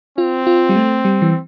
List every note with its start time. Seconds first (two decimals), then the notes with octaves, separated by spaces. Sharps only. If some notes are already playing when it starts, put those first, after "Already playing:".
0.18 C4 F4
0.47 F4
0.69 G3
0.76 A3
1.05 G3
1.22 E3